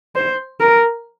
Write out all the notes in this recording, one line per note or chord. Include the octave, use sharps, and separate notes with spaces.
C5
A#4